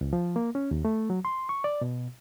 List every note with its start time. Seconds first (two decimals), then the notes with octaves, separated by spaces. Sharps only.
0.01 C#2
0.13 F3
0.36 A#3
0.55 C#4
0.71 D#2
0.85 A3
1.10 F#3
1.25 C6
1.49 C#6
1.64 D5
1.81 B2